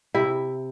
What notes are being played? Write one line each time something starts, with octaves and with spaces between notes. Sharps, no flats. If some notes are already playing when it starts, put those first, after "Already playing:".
C3 E4